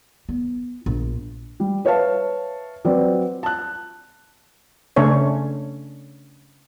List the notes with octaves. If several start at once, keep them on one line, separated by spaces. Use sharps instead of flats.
B3
A#1
G3
B4 C#5 E5 F5 A5
F#3 C4 B4 D5
A5 F#6
C#3 A3 C#4 D4 A4 C#5